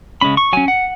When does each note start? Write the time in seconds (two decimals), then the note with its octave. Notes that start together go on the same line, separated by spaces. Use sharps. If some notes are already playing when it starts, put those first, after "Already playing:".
0.21 C#3 G#3 C#4 B5
0.37 C#6
0.53 F#3 C#4 G#5
0.68 F#5